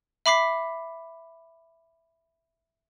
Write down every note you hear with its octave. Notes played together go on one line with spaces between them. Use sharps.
E5 B5 D6 B6 C7